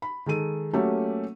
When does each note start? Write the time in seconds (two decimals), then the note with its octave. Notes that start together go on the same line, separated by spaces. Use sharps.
0.02 B5
0.26 D#3 G#3 A4 D#7
0.73 F#3 A3 A#3 C#4 G4 A4